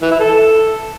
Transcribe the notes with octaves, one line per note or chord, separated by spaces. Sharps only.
E3
E4
A4